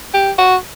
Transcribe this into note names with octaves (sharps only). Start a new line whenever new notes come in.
G4
F#4